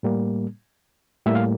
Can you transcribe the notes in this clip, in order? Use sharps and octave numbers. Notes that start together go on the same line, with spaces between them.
A2 G3 A#3
A2 G3 A#3 E5
F5